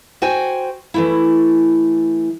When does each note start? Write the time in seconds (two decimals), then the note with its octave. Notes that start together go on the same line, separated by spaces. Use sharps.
0.22 F#4 C5 G5 G#5
0.94 E3 A3 E4